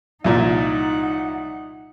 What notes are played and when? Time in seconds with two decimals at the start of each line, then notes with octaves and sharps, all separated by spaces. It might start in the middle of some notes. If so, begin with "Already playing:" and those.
0.24 C2 A#2 F3 D#4 F#5